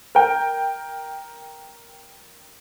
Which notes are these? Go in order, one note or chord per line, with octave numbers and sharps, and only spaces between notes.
A#4 G5